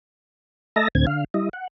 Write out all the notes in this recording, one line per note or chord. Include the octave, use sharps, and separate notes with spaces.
A3 D#5 E5 A5 A#5 A#6
D2 A2 D3 C4 G#6
D3 F5
G3 E4 D#5
F#5